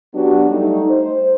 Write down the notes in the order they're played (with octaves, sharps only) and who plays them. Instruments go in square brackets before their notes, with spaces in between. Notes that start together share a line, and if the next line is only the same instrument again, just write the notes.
[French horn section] F#3 B3 D4 F#4 G4
G3 A3 D#4
C5